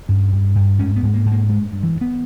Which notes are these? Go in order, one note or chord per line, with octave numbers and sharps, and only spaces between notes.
G2 C#4
G2
G2
G#2 C#4
B3
G#2 G#3
A#3
G#2
A#3
G2 G#3
G2
E3
G2
B3